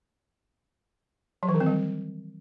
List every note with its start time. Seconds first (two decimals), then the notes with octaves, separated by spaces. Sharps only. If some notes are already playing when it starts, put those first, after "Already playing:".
1.43 F#3
1.49 E3
1.55 D#3
1.60 C4
1.66 G3